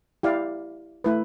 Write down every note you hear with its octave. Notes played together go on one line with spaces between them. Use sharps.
E4 G4 D5 F5
A3 E4 B4